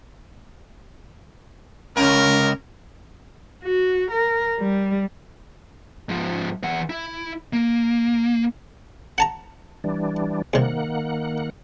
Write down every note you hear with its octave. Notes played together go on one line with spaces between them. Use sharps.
C#2 C#4 A#4
F#4
A#4
G3
G#2 F3
E3 F#5
E4
A#3
F#5 A5 A#5
E3 G3 D4
C2 C3 D#3 A#3 F#5